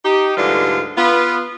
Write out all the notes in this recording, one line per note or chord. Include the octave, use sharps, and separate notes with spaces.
D#4 G4
D2 G#2 D3 E3 G3 F4
B3 F4